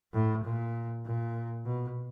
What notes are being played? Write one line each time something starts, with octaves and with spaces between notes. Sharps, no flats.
A2
A#2
A#2
B2